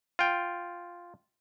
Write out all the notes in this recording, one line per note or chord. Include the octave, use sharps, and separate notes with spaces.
F4 G5